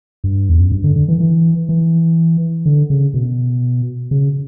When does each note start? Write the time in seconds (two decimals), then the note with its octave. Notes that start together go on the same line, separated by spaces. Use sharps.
0.24 G2
0.49 E2
0.61 F#2
0.72 G2
0.84 D3
0.96 D3
1.08 E3
1.20 E3
1.69 E3
2.66 D3
2.90 C#3
3.14 B2
4.11 C#3